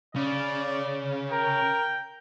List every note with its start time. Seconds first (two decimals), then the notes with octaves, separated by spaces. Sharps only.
0.15 C#3 D5
1.31 A#4 G5